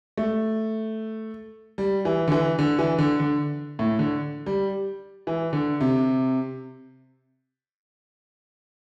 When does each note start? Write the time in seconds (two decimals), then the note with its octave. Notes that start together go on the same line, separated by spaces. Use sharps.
0.17 A3
1.78 G3
2.05 E3
2.27 D3
2.32 E3
2.59 D3
2.79 E3
2.98 D3
3.20 D3
3.79 A2
3.99 D3
4.46 G3
5.27 E3
5.53 D3
5.81 C3